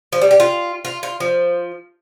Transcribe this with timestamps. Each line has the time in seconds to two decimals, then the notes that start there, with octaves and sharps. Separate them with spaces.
0.13 F3
0.22 G3
0.31 G4
0.40 F4
0.85 F4
1.03 F4
1.20 F3